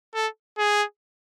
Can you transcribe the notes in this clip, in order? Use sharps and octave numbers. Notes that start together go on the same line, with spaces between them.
A4
G#4